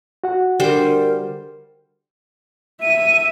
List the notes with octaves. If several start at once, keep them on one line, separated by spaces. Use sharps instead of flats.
F#4 F#5
D3 G3 A#4 C5
E5 D#7